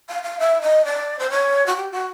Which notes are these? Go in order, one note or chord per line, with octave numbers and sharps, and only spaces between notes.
F5
F5
E5
D#5
D5
C5
C#5
F#4
G4
F#4